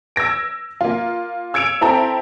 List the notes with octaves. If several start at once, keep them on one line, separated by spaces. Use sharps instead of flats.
E6 G#6 A#6 D7
A#3 F4
E6 G#6 C#7 D7 E7 F7
C4 E4 A4 G5 A#5